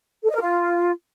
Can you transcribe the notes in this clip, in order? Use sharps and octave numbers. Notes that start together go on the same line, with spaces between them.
A4
D#5
A#4
F4